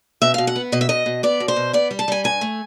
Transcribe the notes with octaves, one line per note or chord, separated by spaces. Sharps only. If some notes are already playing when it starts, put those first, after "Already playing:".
B2 E5
B2 F5
F#5
B3
B2 D#5
E5
B2 D#5
B2
B3 D5
B2
C5
B2
B3 D5
G3
A5
G3 G#5
G2 G#5
A3